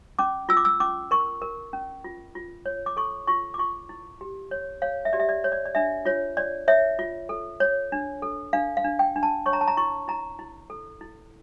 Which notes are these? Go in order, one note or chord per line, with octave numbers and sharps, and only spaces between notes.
C#4 D6
F4 E6
D6
E6
C#4 D6
A#4 C#6
A#4
C#4
F4
F4
C#5
D6
A4 C#6
F4 C#6
D6
F4 C#6
E4
G4
C#5
C#5 F5
E5
G4 D5
E5
D5
C#5
D5
D5
D4 E5
F4 C#5
C#5 D5
C#5 E5
F4
A4
C#5
D4
A4
D4 F5
F5
D4
G5
D4
A5
C#5 C#6
A#5
A5
A#5
E4 C#6
E4 A#5
E4
A4
E4